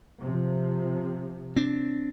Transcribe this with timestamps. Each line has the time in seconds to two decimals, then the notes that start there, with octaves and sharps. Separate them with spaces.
0.22 C3 F3
1.56 C4 D4